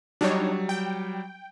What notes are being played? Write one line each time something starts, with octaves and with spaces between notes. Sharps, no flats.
F#3 G3 D4 D#4 C#5
G5